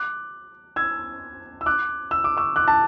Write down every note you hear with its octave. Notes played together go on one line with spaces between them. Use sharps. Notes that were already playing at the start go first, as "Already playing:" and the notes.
Already playing: D6 F#6
E6 G#6
E6
D6 F#6
E6
D6
C#6 E6
D6 F#6
A5